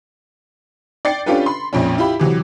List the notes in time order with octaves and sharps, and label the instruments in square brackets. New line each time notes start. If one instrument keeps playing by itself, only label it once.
[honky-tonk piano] D5 G5 A6 C7 C#7
C#4 D4 F4 G4 A4 B4
B5 C6
A#1 F2 A#2 C#4
E4 F4 G4 B5
C3 E3 F#3